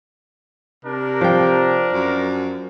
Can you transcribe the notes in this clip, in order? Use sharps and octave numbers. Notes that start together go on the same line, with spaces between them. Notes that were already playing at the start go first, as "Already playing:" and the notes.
C3 D4 A#4
F3 G5
F#2